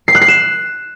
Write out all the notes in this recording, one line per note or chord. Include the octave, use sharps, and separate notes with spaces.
C7
F#6
C7
E7